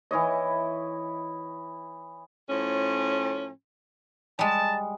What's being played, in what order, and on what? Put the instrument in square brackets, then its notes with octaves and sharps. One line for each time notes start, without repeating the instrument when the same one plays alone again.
[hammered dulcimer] E3 E4 C#5 D#5
[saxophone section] A2 F3 C#4
[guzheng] G3 G#3 [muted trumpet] A5